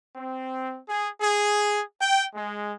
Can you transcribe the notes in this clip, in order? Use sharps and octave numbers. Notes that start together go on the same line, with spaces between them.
C4
G#4
G#4
G5
G#3